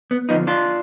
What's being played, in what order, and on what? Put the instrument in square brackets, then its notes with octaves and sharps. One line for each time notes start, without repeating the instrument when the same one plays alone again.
[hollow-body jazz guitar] B3
F3 B3 D#4
D3
D4 F4